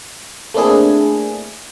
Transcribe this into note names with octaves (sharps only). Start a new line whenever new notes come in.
A3 A#3 C4 D4 E4 G#4